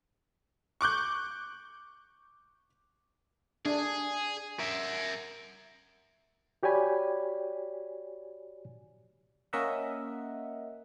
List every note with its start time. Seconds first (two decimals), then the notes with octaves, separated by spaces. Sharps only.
0.81 C#6 D6 F#6 G6
3.66 D4 G#4
4.59 A#4 E5
6.63 F#4 G4 C#5 D5 G#5 B5
9.53 A#3 C#4 A#4 D#5 E5 F#5